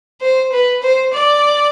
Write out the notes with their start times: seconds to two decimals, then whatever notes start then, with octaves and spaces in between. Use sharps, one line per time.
0.21 C5
0.52 B4
0.83 C5
1.13 D5